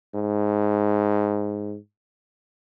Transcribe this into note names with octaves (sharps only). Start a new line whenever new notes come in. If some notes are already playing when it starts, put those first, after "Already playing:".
G#2